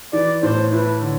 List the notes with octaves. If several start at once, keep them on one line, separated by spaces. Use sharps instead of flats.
E3 D5
A2 C5
E4 B4
D3